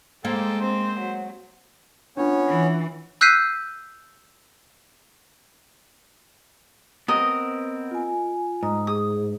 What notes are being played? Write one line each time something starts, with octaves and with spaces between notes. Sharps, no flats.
G#3 A#3 A4 C5 G5
C4 C5
F#3
B3 C#4 D4 F4 C#5
E3
E6 F#6 G6 B6 C7 D#7
B3 C4 A#4 D#5
F4 G#5
G#2 D#5 A#5 D#6
G#4 D#6